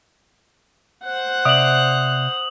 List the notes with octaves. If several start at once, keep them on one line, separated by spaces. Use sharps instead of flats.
C5 F#5 F#6
C3 D5 E5 D#6 F#7